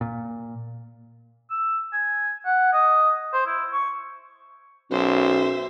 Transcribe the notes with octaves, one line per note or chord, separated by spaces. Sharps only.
A#2
E6
G#5
F#5
D#5
C5
E4
C#6
B1 F#2 C5 E5